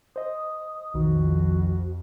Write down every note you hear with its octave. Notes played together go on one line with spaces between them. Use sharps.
C5 D#5 D#6
B1 F2 D#3 F#4